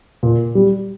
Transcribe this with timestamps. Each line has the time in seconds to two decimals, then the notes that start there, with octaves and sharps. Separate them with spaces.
0.23 A#2
0.55 G3